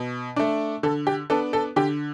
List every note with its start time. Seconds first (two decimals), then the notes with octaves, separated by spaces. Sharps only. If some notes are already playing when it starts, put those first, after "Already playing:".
Already playing: B2
0.36 A3 D4
0.83 D3 A4
1.07 G4
1.30 B3 D4 A4
1.53 A4
1.76 D3 G4